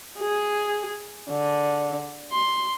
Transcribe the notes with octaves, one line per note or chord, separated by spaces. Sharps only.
G#4
D3
C6